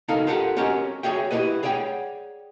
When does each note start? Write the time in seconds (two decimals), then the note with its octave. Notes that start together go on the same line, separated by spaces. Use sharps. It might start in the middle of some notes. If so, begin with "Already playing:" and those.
0.08 C#2 D#4 F#4 A4 A#4 F5
0.27 F4 G4 A4 A#4 E5 F#5
0.57 C#4 F#4 G4 A#4 C#5 D#5
1.03 F#4 G#4 C#5 D5 E5 G5
1.31 E4 F#4 G4 A4 B4 D#5
1.63 G#4 C#5 D5 F#5 G5